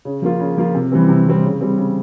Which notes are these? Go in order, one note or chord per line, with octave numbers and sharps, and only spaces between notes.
C#3
F3 A#3 F4
C#3
F3 A#3 F4
C3
E3 G3 C4
C3
E3 G3 C4
C#3
G3 C4
C#3